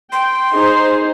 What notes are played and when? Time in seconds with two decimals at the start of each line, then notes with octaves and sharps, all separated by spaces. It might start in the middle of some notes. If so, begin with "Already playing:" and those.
0.12 G5 C6
0.55 D#4 G#4 C5